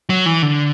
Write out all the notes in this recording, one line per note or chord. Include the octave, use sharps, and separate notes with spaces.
F#3
E3
D3